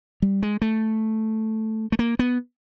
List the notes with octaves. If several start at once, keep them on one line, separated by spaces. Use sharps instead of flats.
G3
G#3
A3
A3
A#3
B3